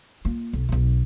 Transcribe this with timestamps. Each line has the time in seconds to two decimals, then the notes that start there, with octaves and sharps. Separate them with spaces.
0.25 A#3 F4
0.53 B1
0.69 B1 B2